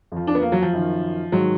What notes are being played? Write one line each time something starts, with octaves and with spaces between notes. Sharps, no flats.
F2 F3
D4
B3
A#3
F#3
F3
F#2 D#3
G#2 D#3 F#3